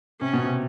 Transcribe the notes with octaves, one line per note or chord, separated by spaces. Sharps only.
C3 C#4
B2
C3